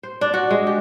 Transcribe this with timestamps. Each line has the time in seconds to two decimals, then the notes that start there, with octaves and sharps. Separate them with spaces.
0.03 C5
0.21 D4
0.34 F#4
0.51 G#3
0.67 G4